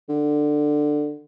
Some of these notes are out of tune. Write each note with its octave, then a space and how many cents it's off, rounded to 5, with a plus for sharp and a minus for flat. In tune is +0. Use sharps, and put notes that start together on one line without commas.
D3 +15